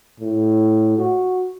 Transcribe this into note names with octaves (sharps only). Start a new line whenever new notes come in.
A2
F#4